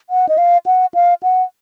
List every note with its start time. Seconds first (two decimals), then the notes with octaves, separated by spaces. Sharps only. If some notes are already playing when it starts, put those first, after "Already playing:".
0.10 F#5
0.29 D#5
0.38 F5
0.66 F#5
0.94 F5
1.23 F#5